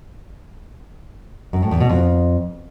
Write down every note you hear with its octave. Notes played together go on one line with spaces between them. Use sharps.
F#2
A2
E2
B2
F2